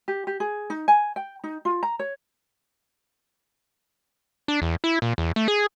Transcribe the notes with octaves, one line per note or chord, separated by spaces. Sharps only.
G4
G4
G#4
D#4
G#5
G5
D#4
F4
A#5
C#5
D4
E2
E4
A#2
E2
A3
G#4